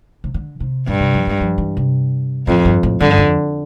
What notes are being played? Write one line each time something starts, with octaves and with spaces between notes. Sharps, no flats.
C3
D3
C3
G2 A#2
C3
F3
G3
F3
E3
C3
F2 A2
G2
A2
G2 D3
F2